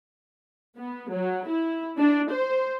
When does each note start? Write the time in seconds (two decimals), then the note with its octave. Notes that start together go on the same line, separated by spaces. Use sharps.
0.78 B3
1.12 F#3
1.49 E4
1.98 D4
2.32 C5